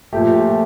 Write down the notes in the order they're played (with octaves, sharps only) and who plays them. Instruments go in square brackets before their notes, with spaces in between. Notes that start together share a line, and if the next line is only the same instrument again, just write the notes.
[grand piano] A#2 F3 A3 G4